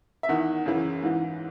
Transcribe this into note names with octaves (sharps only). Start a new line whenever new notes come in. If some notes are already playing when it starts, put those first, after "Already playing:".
E5
E2 D#3 F#5
F#2 C#3 E3
G#2 E3